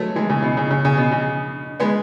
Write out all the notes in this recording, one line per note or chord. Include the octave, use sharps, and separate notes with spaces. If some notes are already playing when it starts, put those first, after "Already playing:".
Already playing: F#3 G#3 A3 B3
E3 G#3
C#3
B2
C#3
C#3
C#3
B2
C#3
G#3 B3